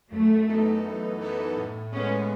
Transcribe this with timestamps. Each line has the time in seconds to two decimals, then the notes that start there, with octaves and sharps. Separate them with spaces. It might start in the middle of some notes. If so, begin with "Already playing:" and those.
0.12 F#2 A3
0.49 E3 B3 D#4 A4
0.85 F#2
1.21 E3 B3 D#4 A4
1.57 A2
1.93 G#3 B3 C#4